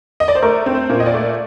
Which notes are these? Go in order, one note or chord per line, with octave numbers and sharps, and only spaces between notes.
D#5
D5
C5
A3 A#4
C4
C5
A#2
D#5
D5
A3